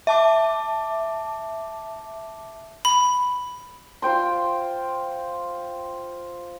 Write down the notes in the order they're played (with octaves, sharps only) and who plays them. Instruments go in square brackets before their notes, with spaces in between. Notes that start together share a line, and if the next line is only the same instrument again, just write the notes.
[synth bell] E5 A5 D6
[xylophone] B5
[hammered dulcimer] F4 C5 G5 C6